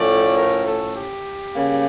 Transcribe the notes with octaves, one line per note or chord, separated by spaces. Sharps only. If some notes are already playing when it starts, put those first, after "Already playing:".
Already playing: A2 F3 A3 C#4 D5
A#4
A4
G4
C#3 G3 A#3